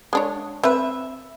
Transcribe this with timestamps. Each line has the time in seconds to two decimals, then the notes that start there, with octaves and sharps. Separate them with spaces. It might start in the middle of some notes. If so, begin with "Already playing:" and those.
0.13 G#3 D4 C#5
0.63 C4 B4 E5